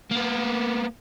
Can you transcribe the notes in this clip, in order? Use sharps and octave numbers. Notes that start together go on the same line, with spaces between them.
A#3 B3